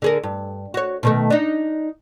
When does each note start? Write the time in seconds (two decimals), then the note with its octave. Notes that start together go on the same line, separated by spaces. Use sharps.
0.02 D3 G#4 A#4
0.23 G2
0.74 F#4 C#5
1.03 B2 D#3 A3
1.30 D4 D#4